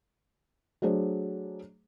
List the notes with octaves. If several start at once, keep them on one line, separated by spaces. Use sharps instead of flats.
F#3 A3 D4 G#4 C5